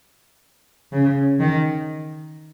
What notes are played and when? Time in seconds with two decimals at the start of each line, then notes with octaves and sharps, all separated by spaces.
0.92 C#3
1.39 D#3